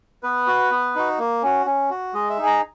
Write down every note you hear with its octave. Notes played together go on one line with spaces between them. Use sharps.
B3 B4
F#4
B3
D#4 F#4
A#3
C#4 F#4
C#4
F#4
G#3 D#5
E5
D#4 G#4
A#5